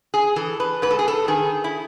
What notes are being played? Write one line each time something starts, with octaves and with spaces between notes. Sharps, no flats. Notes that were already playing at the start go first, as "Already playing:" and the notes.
G#4
E3 A4
B4
G#2 B4
A4
G#4
A4
D#3 G#4
E4